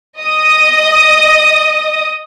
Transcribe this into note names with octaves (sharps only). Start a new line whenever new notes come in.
D#5 D#6